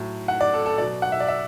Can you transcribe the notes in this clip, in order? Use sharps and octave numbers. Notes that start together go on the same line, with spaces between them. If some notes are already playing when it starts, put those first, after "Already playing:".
Already playing: A2 F#3
F#5
D5
A4
A4
B2 F#3 D5
F#5
E5
D5
E5